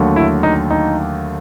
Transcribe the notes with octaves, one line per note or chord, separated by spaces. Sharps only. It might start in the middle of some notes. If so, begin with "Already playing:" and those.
Already playing: D#2 D3 F#3 A3
E4
D#4
D#4